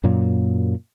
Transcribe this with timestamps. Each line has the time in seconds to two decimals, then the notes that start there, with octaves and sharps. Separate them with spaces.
0.03 F#2 A#2 F#3 A#3